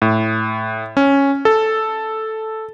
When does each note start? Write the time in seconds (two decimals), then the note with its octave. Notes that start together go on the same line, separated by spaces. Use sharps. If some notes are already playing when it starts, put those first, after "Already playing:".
0.02 A2
0.97 C#4
1.45 A4